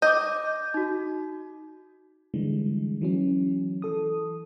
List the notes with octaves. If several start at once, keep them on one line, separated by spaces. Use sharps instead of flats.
D#5 D6 G6
D#4 F#4
D3 E3 G3 G#3
E3 F#3 C#4
E3 A4 D#6